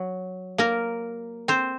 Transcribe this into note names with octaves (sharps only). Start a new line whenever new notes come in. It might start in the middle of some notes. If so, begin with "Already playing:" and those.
Already playing: F#3
A#3 A#4
C4 C5